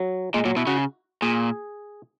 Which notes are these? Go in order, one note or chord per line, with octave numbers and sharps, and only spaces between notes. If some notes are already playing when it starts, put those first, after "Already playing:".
Already playing: F#3
A#2 G#3
A#2 F#3
B2 E4
C#3 F#4
A#2 G#4